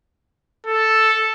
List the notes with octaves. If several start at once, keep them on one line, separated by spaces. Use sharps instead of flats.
A4